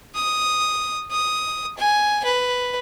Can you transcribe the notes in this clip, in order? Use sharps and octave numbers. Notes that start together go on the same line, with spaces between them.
D#6
D#6
G#5
B4